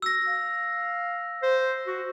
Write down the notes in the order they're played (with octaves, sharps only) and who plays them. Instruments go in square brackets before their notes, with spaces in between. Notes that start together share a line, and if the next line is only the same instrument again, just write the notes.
[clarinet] F#4 [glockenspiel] E6 A#6
[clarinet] F5
C5
F#4